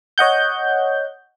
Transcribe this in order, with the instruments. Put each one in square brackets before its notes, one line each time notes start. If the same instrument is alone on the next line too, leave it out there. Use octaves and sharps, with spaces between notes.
[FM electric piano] C#5 D#5 F#5 G6